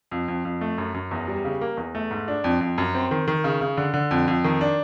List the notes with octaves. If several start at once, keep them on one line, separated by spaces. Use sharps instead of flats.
F2
F2
F2
A3
F#2
F#2
E2
G3
C#3
A#3
E2
A3
G#2
D4
F2
F2
F#2
C4
D#3
D#3
C#3
C#3
D3
D3
F2
F2
D#3
D4